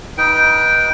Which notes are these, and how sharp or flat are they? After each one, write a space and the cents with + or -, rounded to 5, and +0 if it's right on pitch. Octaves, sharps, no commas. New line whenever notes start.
D#4 +10 B4 -25 G5 -5